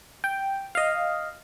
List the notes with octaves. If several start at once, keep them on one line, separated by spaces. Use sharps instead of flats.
G5
D#5 F5